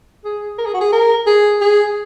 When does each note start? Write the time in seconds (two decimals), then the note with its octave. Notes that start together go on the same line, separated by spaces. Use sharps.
0.24 G#4
0.58 A#4
0.66 G#4
0.74 F#4
0.81 G#4
0.92 A#4
1.26 G#4
1.61 G#4